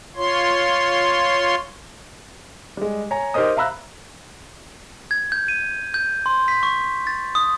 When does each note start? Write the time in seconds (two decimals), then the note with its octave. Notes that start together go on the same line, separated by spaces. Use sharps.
0.16 F4 C#5 C6
2.77 G3 G#3
3.11 C#5 G#5 A#5
3.34 D#4 G4 A#4 C5 D#5 D#6
3.56 E5 F5 A#5 B5 E6 F#6
5.11 G#6
5.32 G6
5.48 D#7
5.94 G6
6.26 C6
6.48 B6
6.63 C#6
7.07 A6
7.35 D#6